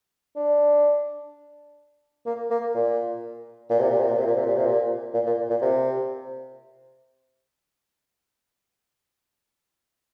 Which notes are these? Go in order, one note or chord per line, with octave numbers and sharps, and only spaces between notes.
D4
A#3
A#3
A#2
A#2
C3
A#2
C3
A#2
C3
A#2
C3
A#2
C3
A#2
A#2
A#2
A#2
C3